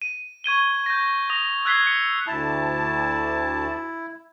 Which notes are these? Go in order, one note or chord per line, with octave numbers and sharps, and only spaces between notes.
D#7
C#6 G#6 D#7 G7
G6 A#6
D#6 A#6 F7
E6 F#6 G#6 B6 C7 G7
C#7
D2 E4 A5